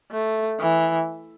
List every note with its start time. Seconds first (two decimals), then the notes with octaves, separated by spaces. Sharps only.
0.11 A3
0.60 E3